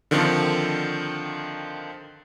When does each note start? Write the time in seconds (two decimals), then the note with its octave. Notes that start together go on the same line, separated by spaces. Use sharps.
0.11 D3 D#3 F3 C4